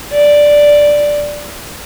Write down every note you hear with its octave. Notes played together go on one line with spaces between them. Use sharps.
D5